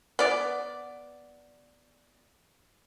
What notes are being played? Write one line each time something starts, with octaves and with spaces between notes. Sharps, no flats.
B3 D5